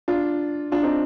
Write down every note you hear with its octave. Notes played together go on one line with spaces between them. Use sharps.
D4 F4
D4 F4
C4 D#4